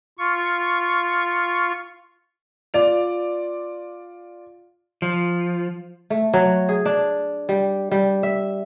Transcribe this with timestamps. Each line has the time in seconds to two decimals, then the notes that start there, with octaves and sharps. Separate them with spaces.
0.18 F4 C#6
2.74 F4 D5 F7
5.02 F3
6.10 A3
6.33 F#3
6.69 G#4
6.86 D4
7.49 G3
7.91 G3
8.23 E5